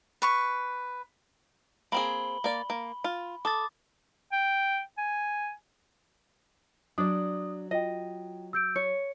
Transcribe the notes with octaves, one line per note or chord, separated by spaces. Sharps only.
B4 C#6
A#3 C4 G#4 B5 F#7 G7
A#3 D5
A#3
F4
A4 D6 D#6 A6
G5
G#5
F#3 D4 D5 D#6
F4 D#5 G5
E6 G6 D7
C#5 C#7